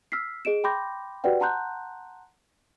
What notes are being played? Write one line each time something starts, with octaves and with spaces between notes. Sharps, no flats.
E6 F6 B6 C7
G#4 D#5 D7 E7
G5 B5 C6 D6 G6 A#6
F#4 G4 B4 D5 F#5 G5
F#5 A5 A#5 C6 F#6 G6